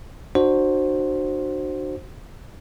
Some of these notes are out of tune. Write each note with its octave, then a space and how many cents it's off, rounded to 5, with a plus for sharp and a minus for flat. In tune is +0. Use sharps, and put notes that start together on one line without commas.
D4 +35 F#4 +0 C5 +10